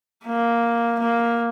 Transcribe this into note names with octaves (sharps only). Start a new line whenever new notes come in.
A#3
A#3